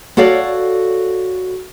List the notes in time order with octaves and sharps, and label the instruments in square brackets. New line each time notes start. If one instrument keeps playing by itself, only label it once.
[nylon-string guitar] F#4 A4 C#5 D5 F5